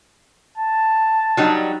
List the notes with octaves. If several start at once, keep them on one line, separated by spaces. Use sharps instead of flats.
A5
F#3 G3 D#4